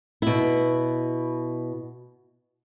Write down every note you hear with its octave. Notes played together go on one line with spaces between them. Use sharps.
B2 E4